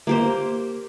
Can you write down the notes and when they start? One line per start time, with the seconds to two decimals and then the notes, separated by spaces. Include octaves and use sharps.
0.07 A#3 G4 C5